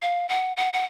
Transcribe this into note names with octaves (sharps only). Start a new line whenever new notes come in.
F5
F#5
F#5
F#5